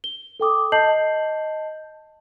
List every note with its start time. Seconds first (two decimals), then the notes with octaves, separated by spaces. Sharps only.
0.04 G7
0.40 A4 G5 D6 D#6
0.72 D#5 A5 G6 C7 F#7